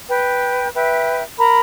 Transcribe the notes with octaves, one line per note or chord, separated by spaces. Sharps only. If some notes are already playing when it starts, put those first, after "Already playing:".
B4 G5
B4 E5 G5
A#4 A#5 B5